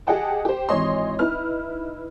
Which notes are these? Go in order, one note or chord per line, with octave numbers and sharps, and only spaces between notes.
G4 G#4 D#5 F#5 G5 A5
G4 C5
G#1 E3 C#5 D#5 C6
D#4 E4 B4 F6